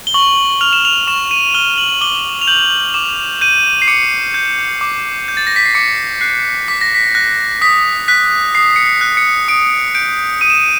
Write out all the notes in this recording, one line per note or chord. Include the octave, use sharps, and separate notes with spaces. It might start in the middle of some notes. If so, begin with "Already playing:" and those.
G7
C#6 F#7
F6 F7
E7
F7
C#6 E7
D#7
F6 G7
F#7
D6 G7
F7
G6 F#7
D6 E7
G6 D#7
C7
D6 C#7
G6
D6
G6
A6
A#6
B6
C7
D6 C#7
F#6 C7
D6 B6
A#6
B6
F#6 A#6
D#6 B6
F#6 B6
D#6 C7
C#7
C7
F#6
C#7
D#6 D7
G6 D7
D#6 D#7
E7
D#7